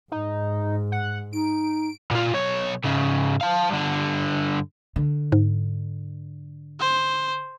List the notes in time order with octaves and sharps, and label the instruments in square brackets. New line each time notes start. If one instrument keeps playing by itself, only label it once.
[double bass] G#2 [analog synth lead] D#4
[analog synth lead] F#5
[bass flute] D#4 [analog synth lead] D7
[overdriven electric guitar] A#2 F4
B1 C#5
G#2 C#3
F5 A5
G2 D3
[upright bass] D3
[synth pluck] G#2
[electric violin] C5